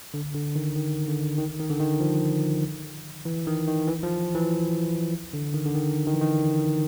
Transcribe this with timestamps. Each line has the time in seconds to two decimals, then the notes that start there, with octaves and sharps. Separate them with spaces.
0.14 D3
0.34 D3
0.56 D#3
0.75 D#3
1.08 D3
1.38 D#3
1.60 D#3
1.70 D3
1.80 D#3
2.00 F3
3.25 E3
3.47 D#3
3.67 D#3
3.87 E3
4.03 F3
4.35 E3
5.33 D3
5.54 D#3
5.65 D3
5.75 D#3
6.07 D#3
6.14 E3
6.21 D#3